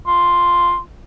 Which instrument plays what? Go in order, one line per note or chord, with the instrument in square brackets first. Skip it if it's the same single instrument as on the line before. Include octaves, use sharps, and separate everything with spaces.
[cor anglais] F4